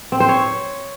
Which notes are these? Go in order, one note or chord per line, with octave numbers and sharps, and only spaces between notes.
C4
C5
C#5